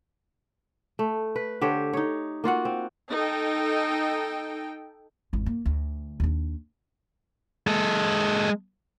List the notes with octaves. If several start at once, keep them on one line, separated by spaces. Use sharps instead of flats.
A3
B4
D3 G4 C5 C#5
D#4 C#5
A#3 F4 F#4 F#5
C4
D#4 A4 G5
G#1 E2
A#3
D2
D#2 D4
G#3 A4